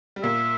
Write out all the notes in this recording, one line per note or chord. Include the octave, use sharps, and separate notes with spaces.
G3
A#2 A#3 E5